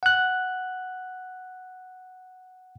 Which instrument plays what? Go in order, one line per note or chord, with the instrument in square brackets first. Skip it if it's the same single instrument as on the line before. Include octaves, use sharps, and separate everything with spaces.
[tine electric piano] F#5 F#6